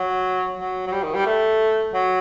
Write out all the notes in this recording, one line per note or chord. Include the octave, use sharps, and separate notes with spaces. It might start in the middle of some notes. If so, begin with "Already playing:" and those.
Already playing: F#3
F#3
F#3
G3
D#3
G3
A3
F#3